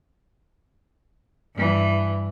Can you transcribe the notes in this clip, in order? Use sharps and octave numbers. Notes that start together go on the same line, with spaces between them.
G2 E3